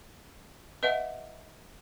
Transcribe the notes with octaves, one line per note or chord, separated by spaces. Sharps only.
B4 D#5 E5 F#5